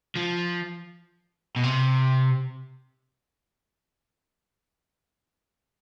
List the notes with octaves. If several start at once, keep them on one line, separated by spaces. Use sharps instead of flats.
F3
B2
C3